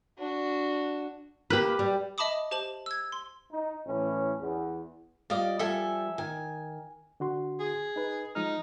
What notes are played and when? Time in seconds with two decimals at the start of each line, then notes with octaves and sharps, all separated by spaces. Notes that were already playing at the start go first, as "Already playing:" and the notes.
0.19 D4 F#4
1.50 A#3 G4 B4
1.79 G3
2.18 D#5 E5 A5 B5 D6 D#6
2.51 G4 C5 A5 E7 F#7
2.86 E6 G#6
3.12 C6
3.51 D#4
3.84 A2 E3 C#4
4.39 E2
5.30 G3 F4 D5 D#5 F5
5.59 F3 G3 A4 E5 G#5
6.18 D#3 G#5
7.20 D3 F#4 C6
7.60 G#4
7.96 D#4 B4
8.35 F3 G#3 D#4 F6